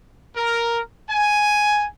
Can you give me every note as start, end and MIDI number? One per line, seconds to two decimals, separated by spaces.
0.36 0.80 70
1.08 1.85 80